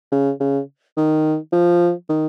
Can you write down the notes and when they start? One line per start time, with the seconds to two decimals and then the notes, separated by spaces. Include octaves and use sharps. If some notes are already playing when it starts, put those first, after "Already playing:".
0.12 C#3
0.40 C#3
0.97 D#3
1.52 F3
2.09 D#3